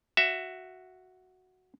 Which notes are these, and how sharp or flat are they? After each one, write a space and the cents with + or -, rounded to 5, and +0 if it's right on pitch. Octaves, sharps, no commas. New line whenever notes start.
F#4 +0 E5 +10